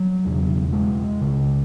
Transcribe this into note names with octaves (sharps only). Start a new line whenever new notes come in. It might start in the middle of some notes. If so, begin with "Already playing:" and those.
Already playing: F#3
E1 E2 C#3
G#3
C#2 C#3